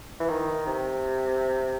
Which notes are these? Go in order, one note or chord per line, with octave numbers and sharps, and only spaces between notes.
E3
D#3
C3